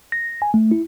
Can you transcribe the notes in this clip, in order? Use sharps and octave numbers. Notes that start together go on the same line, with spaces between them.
A#6
G#5
A3
E4